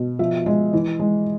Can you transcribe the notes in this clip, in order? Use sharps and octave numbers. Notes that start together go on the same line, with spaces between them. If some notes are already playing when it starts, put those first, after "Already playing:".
Already playing: B2
F3 E5
G#3 D#5
E3
G#3